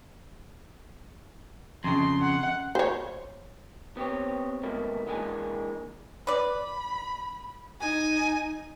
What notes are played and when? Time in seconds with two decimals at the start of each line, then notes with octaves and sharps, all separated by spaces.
1.84 F2 C#3 C6
2.21 F#5
2.75 C5 C#5
3.97 B3 C4 G4 C#5
4.63 D#2 G#2 B2 A3 A#3
5.07 E3 G#3 A#3 D4 G#4 G#5
6.27 B4 D5 B5
7.80 D#4 G#5